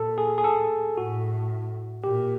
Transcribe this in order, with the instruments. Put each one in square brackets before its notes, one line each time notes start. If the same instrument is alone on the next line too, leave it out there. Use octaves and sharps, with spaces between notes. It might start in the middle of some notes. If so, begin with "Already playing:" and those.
Already playing: [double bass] A#2 [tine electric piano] A4
[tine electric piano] G#4
G#4
A4
[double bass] A2 [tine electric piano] F#4
[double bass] A#2 [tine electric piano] G4